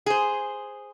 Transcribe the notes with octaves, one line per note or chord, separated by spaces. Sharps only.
G#4 C5